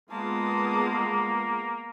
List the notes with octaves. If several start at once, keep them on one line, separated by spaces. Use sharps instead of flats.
G#3 A#3 B3 F4 A5 D#6